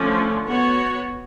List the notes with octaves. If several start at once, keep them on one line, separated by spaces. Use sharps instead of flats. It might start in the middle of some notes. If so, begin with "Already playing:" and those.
Already playing: D3 F3 A3 C#4
B3 F#4 C#5